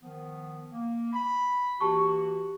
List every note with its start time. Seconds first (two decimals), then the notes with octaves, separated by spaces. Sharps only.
0.02 D#3 F3 B3
0.72 A#3
1.13 B5
1.81 E3 A#3 F#4 G4 A5 C#6